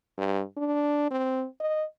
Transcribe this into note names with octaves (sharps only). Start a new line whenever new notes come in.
G2
D4
C4
D#5